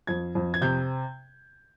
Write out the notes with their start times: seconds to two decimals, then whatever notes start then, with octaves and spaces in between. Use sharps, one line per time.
0.07 F2 G#6
0.35 F2
0.54 G#6
0.61 C3 G6